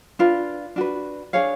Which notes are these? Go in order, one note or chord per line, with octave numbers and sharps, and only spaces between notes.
D4 F4 B4
D4 F#4 B4
D4 G#4 C#5 F5